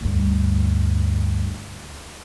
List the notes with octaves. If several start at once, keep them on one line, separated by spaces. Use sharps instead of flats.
D2 G2